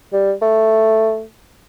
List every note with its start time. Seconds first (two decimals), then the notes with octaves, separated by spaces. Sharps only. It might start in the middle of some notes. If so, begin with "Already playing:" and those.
0.13 G3
0.42 A3